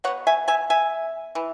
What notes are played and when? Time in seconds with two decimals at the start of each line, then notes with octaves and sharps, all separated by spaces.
0.04 B2 C#5 F#5
0.07 B3
0.27 E5 G#5
0.48 E5 G#5
0.70 E5 G#5
1.35 E3